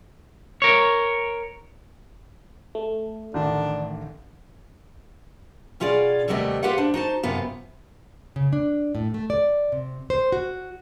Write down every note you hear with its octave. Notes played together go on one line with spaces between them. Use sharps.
A#4 C#5
A3
A1 D3 D#3 D4
B2 C#4 F4 G#4 D5
D#2 C3 G3 A3 B3 D#5
F4 G4 B4 C5 F5 F#5
D4 C5
D#4 F#4 C5 A5
F#2 C3 B3 F4
C#3
D4
A2
A3
D5
C3
C5
F#4